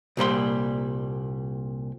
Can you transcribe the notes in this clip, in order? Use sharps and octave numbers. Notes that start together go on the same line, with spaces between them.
C2 A#2 G3 C6